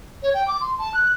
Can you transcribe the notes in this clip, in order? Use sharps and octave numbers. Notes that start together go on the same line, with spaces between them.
C#5
G5
D6
C6
A5
F#6